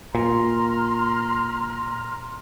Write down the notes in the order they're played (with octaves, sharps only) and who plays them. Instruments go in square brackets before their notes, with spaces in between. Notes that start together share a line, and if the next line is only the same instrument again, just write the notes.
[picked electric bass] A#2 [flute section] A#5 C6 F6